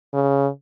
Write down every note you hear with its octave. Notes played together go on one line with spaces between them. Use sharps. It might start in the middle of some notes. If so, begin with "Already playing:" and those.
C#3